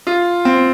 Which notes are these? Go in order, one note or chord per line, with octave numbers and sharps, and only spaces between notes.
F4
C4